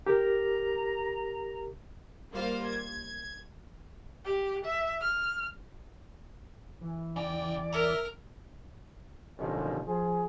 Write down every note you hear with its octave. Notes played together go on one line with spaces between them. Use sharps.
G4 A#4 A#5
G3 A#3 F4 C5 F5
G#6
G4
E5
F6
E3
E2 C#3 D5 G5
A#4 C#5 E5 A#5
A1 D#2 B2 D3 D#3 F3
F3 G#4